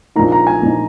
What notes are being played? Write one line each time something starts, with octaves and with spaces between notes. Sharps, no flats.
A#1 A#2 A#3 D#4 A#5
A#5
G#5
A#1 A#2 A#3 D#4